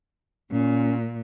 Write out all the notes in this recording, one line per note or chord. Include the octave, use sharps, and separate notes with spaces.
A#2 C#4